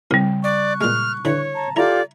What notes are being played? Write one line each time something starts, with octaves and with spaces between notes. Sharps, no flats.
C2 C#3 G3 C6
D5 C#6 F#6
A#2 G#3 F6
D3 E3 C#5
A5 A#5
E4 F4 G4 A4 D5 A#5